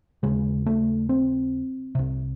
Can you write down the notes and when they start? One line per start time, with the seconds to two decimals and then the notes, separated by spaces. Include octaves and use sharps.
0.23 D#2 C#3 G#3
0.66 A3
1.09 C4
1.95 C2 C3